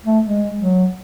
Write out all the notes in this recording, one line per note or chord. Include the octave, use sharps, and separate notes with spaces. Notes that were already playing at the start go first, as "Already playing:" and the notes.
A3
G#3
F#3